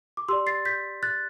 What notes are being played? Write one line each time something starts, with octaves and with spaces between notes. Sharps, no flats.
D6
G4 D5 C6 E6
A6 C7
G6 B6
F#6 A6